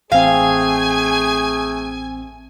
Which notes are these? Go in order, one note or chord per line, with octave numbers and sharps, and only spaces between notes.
A1 A3 C4 G#4 F5 G#5